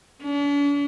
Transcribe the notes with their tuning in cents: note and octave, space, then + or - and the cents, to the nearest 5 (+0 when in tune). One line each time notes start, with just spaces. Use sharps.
D4 -45